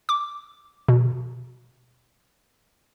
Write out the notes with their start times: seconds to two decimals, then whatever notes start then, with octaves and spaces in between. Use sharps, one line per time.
0.09 D6
0.88 B2